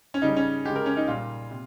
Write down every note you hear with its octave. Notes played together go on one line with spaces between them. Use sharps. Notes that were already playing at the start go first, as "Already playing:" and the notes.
C#4
C#3 G3 D#4
C#4
C#3 G#3 G4
A#4
C#4
D#4
A#2 G3 F4
C3